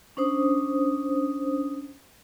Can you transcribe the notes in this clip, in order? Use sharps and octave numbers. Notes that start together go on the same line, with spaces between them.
C#4 D4 C5 D#6